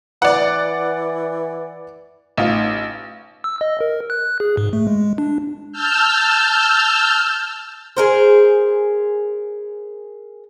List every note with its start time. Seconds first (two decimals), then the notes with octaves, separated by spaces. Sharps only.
0.22 E3 D5 F#5
2.37 A1 D#4 F4
3.44 E6
3.61 D#5
3.81 A#4
4.10 F#6
4.40 G#4
4.57 G#2
4.73 A3
4.87 G#3
5.18 D4
5.73 A5 E6 F6 G6
7.96 G#4 A#4 C5